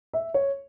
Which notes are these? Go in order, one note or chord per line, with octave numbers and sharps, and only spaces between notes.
E5
C#5